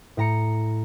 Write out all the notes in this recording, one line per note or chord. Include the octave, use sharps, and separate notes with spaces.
A2 A#5 C#7